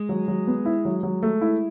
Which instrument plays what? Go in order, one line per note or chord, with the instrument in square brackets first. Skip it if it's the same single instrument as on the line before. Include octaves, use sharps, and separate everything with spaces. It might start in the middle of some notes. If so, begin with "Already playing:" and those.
Already playing: [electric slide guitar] G#3
[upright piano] F#3
F#3
B3
E4
F#3
F#3
A3
E4